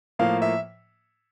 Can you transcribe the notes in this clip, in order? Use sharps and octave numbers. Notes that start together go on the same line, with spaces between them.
A2 F3 A#3 F5
E5